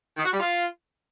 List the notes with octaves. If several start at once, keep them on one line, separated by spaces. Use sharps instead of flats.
D#3
F#4
G3
F4